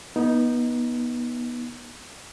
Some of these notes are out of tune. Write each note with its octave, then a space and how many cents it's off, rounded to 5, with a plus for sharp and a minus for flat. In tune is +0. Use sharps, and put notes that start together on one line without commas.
B3 -25 D#4 +5